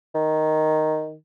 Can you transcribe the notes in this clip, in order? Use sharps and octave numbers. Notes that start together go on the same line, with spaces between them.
D#3